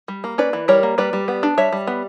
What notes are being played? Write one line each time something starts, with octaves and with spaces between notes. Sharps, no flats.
G3
A#3
C#4 B4 D5
E3
G3 A#4 C#5
A#3
G3 B4 D5
G3
B3
D4
G3 C#5 E5
G3
B3